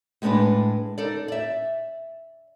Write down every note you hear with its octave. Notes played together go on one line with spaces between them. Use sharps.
A2 G#3 B3 C4 D4 B4
D#4 A4 D5
D5 E5